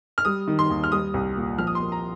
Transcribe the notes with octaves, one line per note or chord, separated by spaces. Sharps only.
F6
G3 D#6
D#3
C6
D#2
F6
G3 D#6
C2
A#2
F3 F6
D#6
C6
A#3
A#5